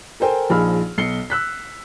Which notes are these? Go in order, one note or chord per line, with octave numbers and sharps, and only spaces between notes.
A4 A#4 C5 G5 G#5
A#1 F3 D#4 G#4 B5 F6
B1 C7 C#7 G7
E6 F#6 B6